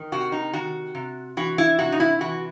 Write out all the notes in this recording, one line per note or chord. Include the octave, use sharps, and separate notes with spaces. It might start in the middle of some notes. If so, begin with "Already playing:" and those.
Already playing: D#3
C3 F#4
D#4
D#3 F#4
C3
E3 F#4
E4
C3 F#4
D#4
E4
E3 F#4